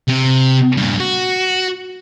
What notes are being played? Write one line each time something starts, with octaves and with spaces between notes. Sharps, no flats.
C3
G2 A#2
F#4